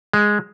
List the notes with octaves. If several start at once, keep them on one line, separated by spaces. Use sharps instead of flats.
G#3